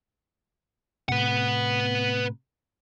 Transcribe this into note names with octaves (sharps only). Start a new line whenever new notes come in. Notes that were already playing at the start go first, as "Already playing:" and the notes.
A2 C3 B4 F#5